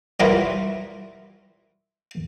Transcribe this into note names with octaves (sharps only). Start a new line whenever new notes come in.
F#3 G3 E4 F4 A#4 B4